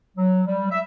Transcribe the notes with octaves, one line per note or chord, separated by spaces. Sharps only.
F#3
G3
E5